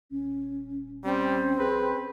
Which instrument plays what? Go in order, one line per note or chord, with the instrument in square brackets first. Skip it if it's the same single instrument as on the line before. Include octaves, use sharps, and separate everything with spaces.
[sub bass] D#1 [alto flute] C#4
[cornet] G3 [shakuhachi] C4 [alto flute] C#4
[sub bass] A#1 [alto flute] G#4 [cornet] B4